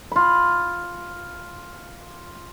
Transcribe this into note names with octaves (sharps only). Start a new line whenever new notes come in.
F4 B5